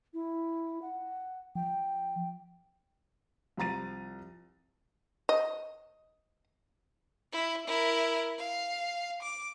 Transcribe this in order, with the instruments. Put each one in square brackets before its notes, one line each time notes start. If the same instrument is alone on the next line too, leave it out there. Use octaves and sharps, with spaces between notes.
[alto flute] E4
F#5
[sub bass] F3 [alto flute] G5
[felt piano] C2 F3 A#5 A6 D#7
[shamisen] D#5
[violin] E4
E4 A#4
F5
D6